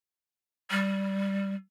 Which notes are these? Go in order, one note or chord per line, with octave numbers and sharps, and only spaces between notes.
G3